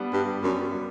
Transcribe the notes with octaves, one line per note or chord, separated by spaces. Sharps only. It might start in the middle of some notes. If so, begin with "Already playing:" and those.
Already playing: G3 B3 D4
G2 G3
F#2 G3
G3